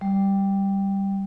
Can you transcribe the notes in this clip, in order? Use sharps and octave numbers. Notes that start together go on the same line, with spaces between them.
G3